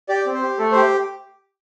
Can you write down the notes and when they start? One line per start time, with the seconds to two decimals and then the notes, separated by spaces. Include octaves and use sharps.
0.09 G4 D5
0.26 C4
0.34 C5
0.42 G4
0.58 A3 A4
0.72 G4 C5